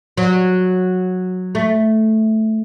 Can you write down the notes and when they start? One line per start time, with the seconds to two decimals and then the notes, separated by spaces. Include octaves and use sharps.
0.18 F#3
1.55 A3